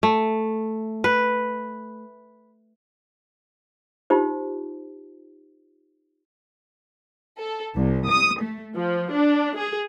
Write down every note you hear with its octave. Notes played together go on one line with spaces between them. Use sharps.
A3
B4
D#4 F4 G4 C5
A4
C2
D#6
A3
F3
D4
G#4